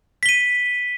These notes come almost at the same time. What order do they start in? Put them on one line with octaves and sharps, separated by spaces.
B6 G7 D#7